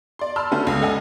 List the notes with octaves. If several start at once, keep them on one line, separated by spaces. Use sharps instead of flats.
D5 C6
A5 B5 C6 E6 F6
D3 A3 C#4 D4 F#4
C#2
A4 D#5 F#5 G#5